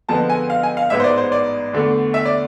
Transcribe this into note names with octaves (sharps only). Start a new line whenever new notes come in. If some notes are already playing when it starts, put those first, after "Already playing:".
F2 D3 F3 G#3 B3 A5
G#5
F5
G#5
F5
A1 G#2 G#3 B3 E5
C5
D5
C5
D5
E2 D3 A3
E5
D5